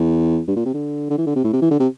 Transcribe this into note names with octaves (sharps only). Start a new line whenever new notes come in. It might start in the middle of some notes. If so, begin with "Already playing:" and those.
Already playing: E2
G2
A#2
C3
D3
D3
E3
D3
C3
A2
C3
E3
D3
C3